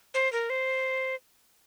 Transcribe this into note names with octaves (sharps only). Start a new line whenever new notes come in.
C5
A#4
C5